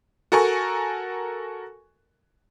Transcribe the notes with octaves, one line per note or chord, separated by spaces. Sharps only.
F#4 A4 A#4 G#5 C#6